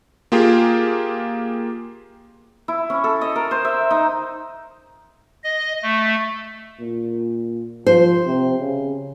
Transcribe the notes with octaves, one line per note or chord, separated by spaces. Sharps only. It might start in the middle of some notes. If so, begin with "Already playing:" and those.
A#3 F4 G4 G#4
E4
C#4
A4
D#5
A#4
C5
E5
D#4
D#5
A3
A#2
F3 C5
C3
C#3